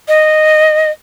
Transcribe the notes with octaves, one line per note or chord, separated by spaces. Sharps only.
D#5